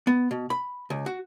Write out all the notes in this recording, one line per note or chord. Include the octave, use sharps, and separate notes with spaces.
B3
B2
B5
C#2
F#4